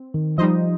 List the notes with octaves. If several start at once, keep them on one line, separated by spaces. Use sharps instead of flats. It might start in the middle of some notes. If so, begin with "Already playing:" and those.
Already playing: C4
D#3
F3 G3 D#4 C5 D#5